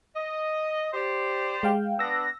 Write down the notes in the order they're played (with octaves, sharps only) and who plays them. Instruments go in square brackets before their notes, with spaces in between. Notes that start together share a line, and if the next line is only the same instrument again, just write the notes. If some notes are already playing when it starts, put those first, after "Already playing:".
[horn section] D#5
G4 C5 D5
[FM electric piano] G#3 F5 G5
[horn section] B3 D4 [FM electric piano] E6 A#6